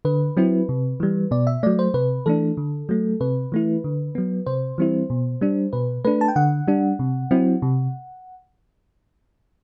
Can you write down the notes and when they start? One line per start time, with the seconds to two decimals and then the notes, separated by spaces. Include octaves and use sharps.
0.05 D3 B4
0.37 F#3 C4 E4
0.69 C3
1.00 E3 G3
1.31 B2 D5
1.47 E5
1.63 F#3 A3 D5
1.79 C5
1.94 C3 B4
2.26 E3 A3 D4 A4
2.57 D3
2.89 F#3 A3
3.20 C3 B4
3.52 E3 A3 E4
3.84 D3
4.15 F#3 B3
4.46 C3 C5
4.78 E3 G3 C4 E4
5.10 B2
5.41 G3 D4
5.73 B2 B4
6.05 A3 D4 B4
6.21 A5
6.28 G5
6.36 D3 F#5
6.68 G3 D4
6.99 C3
7.31 F#3 C4 E4
7.62 C3